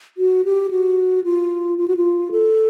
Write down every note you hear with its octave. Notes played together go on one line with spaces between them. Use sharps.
F#4
G4
F#4
F4
F4
F#4
F4
A4